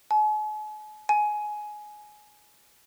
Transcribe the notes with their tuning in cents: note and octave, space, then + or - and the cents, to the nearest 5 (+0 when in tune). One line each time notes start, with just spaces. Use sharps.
G#5 +45
G#5 +15